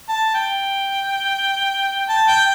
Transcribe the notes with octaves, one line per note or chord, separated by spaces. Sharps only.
A5
G5
A5
G5